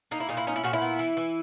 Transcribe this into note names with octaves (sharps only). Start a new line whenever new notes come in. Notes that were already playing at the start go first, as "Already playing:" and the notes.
A#3 D#4
E4
A#2 D#4
E4
C#4 D#4
E4
A#2 F#4
E4
B3
E3
E3